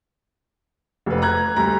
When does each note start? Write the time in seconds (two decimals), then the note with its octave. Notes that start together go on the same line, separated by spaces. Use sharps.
1.06 F1 B4
1.22 A#5 F#6 G#6
1.56 D2 G3 A#5